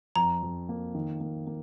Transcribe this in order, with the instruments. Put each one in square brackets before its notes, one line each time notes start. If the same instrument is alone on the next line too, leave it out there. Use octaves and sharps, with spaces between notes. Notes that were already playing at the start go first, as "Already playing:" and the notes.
[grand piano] F2 [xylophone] A#5
[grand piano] F2
A#3
D#3
A#3
A#3